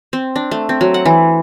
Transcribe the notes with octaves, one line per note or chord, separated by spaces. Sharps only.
C4
D4
A3
C4
F#3
F#5
E3